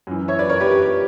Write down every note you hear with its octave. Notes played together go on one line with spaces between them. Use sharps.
F#2 E3
C#5 E5
B4 D5
A#4 C#5
G4 B4
G4
G4